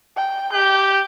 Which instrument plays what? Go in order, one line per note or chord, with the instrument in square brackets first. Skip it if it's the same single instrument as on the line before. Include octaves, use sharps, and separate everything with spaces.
[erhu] G5
[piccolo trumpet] G4 [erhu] G6